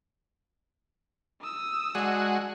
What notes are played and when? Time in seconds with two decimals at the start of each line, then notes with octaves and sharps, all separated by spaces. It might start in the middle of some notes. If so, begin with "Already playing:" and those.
1.42 D#6 E6
1.95 G#3 D4 F#4 F#5